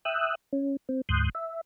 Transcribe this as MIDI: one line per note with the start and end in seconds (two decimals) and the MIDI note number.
0.05 0.35 76
0.05 0.35 79
0.05 0.35 87
0.05 0.35 88
0.05 0.35 90
0.53 0.76 61
0.89 1.01 60
1.09 1.29 38
1.09 1.29 44
1.09 1.29 84
1.09 1.29 87
1.09 1.29 90
1.09 1.29 91
1.35 1.61 76